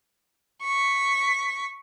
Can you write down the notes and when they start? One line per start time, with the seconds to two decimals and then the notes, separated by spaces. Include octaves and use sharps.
0.63 C#6 B6